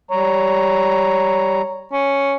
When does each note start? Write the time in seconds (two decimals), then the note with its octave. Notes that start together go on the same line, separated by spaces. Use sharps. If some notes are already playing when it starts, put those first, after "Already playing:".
0.11 G3 C#5 A#5
1.92 C#4